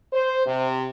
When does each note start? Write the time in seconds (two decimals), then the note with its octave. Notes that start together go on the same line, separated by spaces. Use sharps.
0.12 C5
0.46 C3